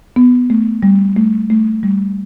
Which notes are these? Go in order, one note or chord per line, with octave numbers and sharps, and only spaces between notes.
B3
A3
G3
A3
A3
G3